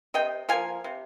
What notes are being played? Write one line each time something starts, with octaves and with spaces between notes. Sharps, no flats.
C3 D#5 G5
F3 A#3 F5 G#5
C3